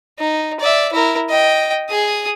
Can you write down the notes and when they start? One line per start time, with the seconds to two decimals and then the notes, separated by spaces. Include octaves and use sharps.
0.19 D#4
0.60 D5 E5
0.93 E4 A#4
1.29 D#5 G5
1.89 G#4 D#6